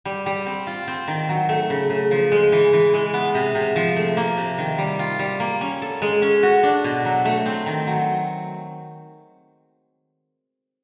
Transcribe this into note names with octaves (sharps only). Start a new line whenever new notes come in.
G3
G3
C4
F4
C4
D#3
F#3
A3
C#3
C#3
F3
G#3
E3
E3
G#3
B3
C3
C3
F3
A3
A#3
C3
D#3
G3
F4
G3
A#3
C#4
A4
G#3
C#4
F#4
D4
B2
F#3
A3
C4
D#3
F#3